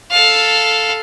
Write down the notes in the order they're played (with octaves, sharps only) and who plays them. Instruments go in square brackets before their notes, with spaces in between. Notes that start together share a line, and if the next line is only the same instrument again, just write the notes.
[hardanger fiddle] A4 F5